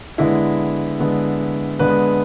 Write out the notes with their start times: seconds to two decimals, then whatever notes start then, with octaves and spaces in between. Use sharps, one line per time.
0.18 D3 G#3 B3 E4
0.99 D3 G#3 B3
1.79 D3 G#3 B3 B4